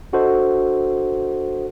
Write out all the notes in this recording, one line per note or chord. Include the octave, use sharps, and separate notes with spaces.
D4 F#4 A4 C5 D#5